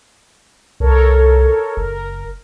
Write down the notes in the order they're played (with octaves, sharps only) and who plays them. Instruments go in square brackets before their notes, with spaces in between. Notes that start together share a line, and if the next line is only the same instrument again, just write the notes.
[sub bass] C2 [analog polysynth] A4 A#4 C#5
[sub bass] F#1 [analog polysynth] A#4